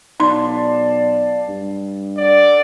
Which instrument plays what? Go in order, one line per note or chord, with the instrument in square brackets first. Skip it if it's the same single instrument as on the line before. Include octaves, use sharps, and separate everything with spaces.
[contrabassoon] B1 [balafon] D#4 C6 [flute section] D5 F5 A5
[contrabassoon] G2
[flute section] A4 F#5 [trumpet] D5